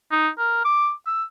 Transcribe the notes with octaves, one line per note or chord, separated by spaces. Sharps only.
D#4
A#4
D6
E6